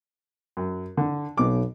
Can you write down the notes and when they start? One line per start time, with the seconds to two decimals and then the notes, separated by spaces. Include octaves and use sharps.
0.57 F#2
0.97 D3
1.38 B1 B2 D6